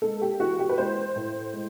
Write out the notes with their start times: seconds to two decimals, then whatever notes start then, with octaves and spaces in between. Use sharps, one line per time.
0.02 G#3 A4
0.22 G4
0.40 E3 F#4
0.59 G4
0.69 B4
0.77 G#3 C5
1.16 A2
1.53 G#3